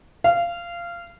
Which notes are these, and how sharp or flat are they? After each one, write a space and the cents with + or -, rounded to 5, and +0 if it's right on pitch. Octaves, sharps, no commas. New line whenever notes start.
F5 -20